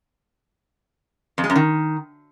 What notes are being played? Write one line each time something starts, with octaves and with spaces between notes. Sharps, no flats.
F2
G#3
F#2
D#3